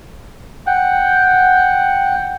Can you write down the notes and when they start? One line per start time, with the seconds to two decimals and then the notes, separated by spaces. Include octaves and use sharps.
0.67 F#5 G5